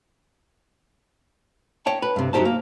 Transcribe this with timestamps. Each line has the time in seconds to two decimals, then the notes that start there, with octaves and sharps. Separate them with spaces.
1.86 C#5 G5 A5
2.02 B4
2.16 G2 C3
2.33 F#2 F#3 D#4 G4 C5 A5
2.45 A#3